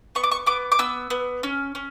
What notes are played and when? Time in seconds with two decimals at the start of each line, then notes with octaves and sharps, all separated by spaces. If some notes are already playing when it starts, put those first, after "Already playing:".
0.15 B3 C#6
0.24 D6
0.32 C#6
0.46 B3 D6
0.72 D6
0.79 B3 E6
1.10 B3
1.43 C#4
1.75 C#4